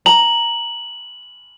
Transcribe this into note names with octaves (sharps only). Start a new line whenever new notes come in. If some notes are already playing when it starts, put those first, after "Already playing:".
A#5 F#7